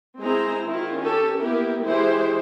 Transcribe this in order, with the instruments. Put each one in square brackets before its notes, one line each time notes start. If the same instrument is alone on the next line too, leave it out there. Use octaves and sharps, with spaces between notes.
[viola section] G#3 C4 E4 G#4 C5 A#5
D#3 E4 F4
C#4 G4 A4
A#3 B3 E4 G4 A#4
E3 G#3 E4 G4 C5